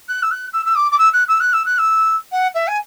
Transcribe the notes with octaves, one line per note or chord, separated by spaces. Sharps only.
F#6
E6
F#6
E6
E6
D6
D6
E6
F#6
E6
F#6
E6
F#6
E6
F#5
E5
G#5